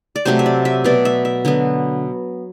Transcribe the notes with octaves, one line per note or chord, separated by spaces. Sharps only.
D5
C3 F#3 A3 C5
E5
D5
E5
B2 F#3 B3 D5
E5
E5
D3 F#3 B3